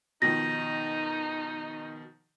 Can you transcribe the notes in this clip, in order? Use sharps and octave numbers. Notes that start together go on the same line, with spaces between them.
B2 D#3 F3 D#4 A#6